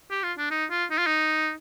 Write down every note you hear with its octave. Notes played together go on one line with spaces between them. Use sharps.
G4
F4
D4
D#4
F4
D#4
F4
D#4